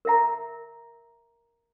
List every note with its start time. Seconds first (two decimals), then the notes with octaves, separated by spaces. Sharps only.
0.05 A#4 E5 A#5